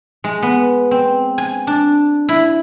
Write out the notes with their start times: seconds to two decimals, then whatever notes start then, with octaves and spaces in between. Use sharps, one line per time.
0.24 G#3
0.43 B3
0.91 C4
1.38 G#5
1.67 D4
2.29 E4